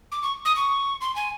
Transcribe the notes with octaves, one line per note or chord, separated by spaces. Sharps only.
D6
C#6
D#6
C#6
C6
G#5